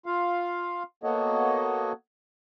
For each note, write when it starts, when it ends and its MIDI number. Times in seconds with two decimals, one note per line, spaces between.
0.06 0.83 65
0.06 0.83 77
1.03 1.92 58
1.03 1.92 59
1.03 1.92 66
1.03 1.92 69
1.03 1.92 73
1.03 1.92 75